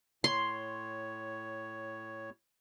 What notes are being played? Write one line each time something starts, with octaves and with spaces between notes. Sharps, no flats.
A2 C#5 C6